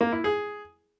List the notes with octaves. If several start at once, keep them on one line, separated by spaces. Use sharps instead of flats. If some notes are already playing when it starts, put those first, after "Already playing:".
A#3
E4
G#4